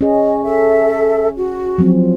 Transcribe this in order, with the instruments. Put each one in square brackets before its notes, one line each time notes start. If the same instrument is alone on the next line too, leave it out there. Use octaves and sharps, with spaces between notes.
[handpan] C#4 G#4 [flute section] D#5
[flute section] A4 E5
F#4
[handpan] F3 F#3 C4